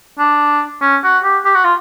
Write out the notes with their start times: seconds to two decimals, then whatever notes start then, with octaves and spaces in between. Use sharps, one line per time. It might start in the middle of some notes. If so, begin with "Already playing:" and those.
0.19 D4
0.82 C#4
1.04 F#4
1.24 G4
1.45 G4
1.55 F#4
1.65 F4